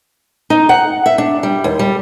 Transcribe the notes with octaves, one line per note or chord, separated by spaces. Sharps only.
D#4
F#5
E5
D4
G3
D#2
G3